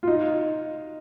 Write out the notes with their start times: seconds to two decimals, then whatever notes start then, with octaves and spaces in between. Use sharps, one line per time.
0.03 F4
0.07 D#4